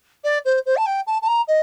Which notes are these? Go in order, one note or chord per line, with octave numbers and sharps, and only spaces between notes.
D5
C5
C5
A5
G5
A5
A5
A#5
D#5